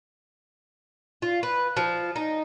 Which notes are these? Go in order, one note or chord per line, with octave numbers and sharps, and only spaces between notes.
F4
B4
F3
D#4